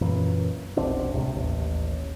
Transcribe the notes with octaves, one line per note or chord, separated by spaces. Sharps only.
F#2 A#2 E3
F1 B1 C4 D4
C#2 A2 C3
A1 D#2